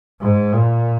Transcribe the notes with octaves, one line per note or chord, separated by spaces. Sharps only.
G#2
A#2